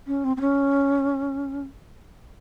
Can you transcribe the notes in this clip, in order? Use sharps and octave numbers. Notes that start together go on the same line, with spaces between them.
C#4
C4
C4
C#4